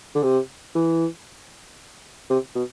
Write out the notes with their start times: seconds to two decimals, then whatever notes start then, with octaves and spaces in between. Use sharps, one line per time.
0.15 D3
0.23 C3
0.75 E3
2.30 C3
2.55 B2